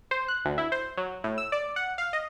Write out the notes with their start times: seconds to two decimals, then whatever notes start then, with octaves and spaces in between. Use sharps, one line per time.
0.11 C5
0.28 F#6
0.45 D2
0.58 E4
0.72 C5
0.97 F#3
1.24 A2
1.38 E6
1.52 D5
1.76 F#5
1.98 F5
2.13 D#5